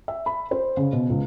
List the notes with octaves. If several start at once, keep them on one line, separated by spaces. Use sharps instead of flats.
E5
B5
C5
C#3
B2
C#2